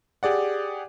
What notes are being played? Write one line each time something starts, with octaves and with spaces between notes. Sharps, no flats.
G4 G#4 D5 F#5